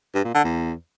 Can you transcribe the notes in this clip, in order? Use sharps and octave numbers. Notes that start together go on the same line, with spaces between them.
G2
A#2
D3
E2